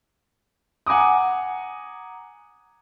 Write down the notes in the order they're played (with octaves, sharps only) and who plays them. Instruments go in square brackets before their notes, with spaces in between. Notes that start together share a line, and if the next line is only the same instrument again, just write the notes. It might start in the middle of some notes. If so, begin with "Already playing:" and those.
[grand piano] F#5 G#5 A#5 D6 D#6